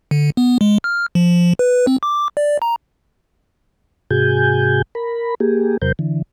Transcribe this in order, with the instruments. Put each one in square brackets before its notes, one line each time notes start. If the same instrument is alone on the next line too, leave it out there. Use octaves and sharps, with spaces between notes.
[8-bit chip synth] D3
B3
G#3
F6
F3
B4
C4
D6
D5
A#5
[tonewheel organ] G#2 C3 F#4 G#4 G#5 G6
A#4 B5
A#3 G4 G#4
E2 C3 F#3 A#4 C5 G6
D3 E3